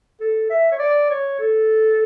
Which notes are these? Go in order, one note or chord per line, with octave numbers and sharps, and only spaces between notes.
A4
E5
C#5
D5
C#5
A4